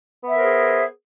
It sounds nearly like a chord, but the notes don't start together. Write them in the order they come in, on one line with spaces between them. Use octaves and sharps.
B3 E5 A#4 C5 G#4